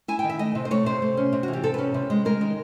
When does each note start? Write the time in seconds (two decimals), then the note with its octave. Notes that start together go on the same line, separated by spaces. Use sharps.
0.08 E4 G#5
0.19 G5
0.24 D#3
0.29 E5
0.39 A3 D#5
0.55 C3
0.65 C5
0.71 A3 C#5
0.86 C3 C5
1.02 A3
1.17 C#4
1.33 C3
1.43 F#4
1.48 E3
1.53 G4
1.63 C3 A4
1.74 C#4 B4
1.94 C3
2.10 G#3
2.25 G#3 A#4
2.41 D#3